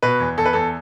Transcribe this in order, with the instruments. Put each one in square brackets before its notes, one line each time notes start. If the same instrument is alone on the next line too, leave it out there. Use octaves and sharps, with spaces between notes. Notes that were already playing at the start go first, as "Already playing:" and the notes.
[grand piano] B2 B4
E2
E2 A4
B4
E2 A4